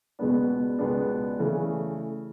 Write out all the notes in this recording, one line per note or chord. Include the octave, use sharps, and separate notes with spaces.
C#2 B2 G#3 B3 D4
C#2 B2 G#3 B3 D4
C#3 E3 A3